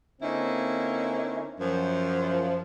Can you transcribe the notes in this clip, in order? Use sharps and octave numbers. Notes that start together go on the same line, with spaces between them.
D3 A#3 C4 C#4 D#4 E4
F#2 F3